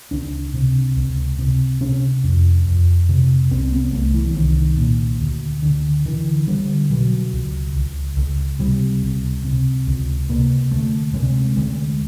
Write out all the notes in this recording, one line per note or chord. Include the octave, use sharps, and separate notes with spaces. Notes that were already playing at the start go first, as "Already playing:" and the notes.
C#2 D4
C3
C#2
C3
C3 C#4
F2
F2
C3
C2 C4
B3
C2 A3
E3
C2 D#3
A#2
D2
D3
D3 E3
D3 G3
B2 F#3
C#2
C#2
C#2
C3 G3
C#2
C3
C#2
C3 A#3
D2 A3
C3 G#3
D2 G#3